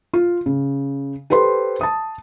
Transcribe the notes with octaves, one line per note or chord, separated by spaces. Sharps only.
F4
C#3
G4 A4 B4 C5 C6
A5 D#6